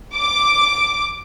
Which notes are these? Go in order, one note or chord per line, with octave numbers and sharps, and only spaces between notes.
D6